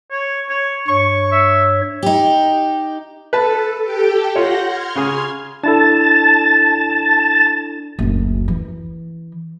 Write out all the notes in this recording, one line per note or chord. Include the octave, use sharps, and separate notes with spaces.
C#5
C#5
G2 C#5 C#6
E5
D#4 G4
A4 B4 A5
G4 A4 G5
F4 C#5 F#5 G6 A#6
C6 F6 G#6
C#3 G#4
D4 E4 A4 A5
F#1 D2
E3